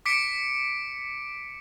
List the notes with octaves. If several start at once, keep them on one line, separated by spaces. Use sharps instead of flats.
D6 B6 C#7 D7